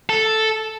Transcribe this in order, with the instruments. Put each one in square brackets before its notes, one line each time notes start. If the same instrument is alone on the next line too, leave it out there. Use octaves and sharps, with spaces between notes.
[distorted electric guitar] A4